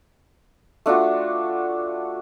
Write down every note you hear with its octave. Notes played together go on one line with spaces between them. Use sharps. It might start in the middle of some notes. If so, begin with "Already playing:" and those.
A3 D4 F4 F#4